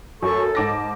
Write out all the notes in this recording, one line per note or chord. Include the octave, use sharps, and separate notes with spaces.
F#2 A4 C#6
G#2 A5 D6 A#6